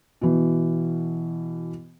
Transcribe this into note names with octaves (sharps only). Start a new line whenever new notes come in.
B2 E3